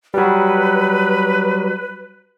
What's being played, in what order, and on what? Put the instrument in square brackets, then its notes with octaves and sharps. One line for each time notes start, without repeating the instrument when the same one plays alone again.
[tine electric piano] F#3 G3 [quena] B4